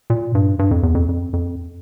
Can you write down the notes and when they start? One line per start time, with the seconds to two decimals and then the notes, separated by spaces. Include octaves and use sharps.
0.10 A#2
0.35 G2
0.59 G2
0.71 F2
0.83 E2
0.95 F2
1.09 F2
1.33 F2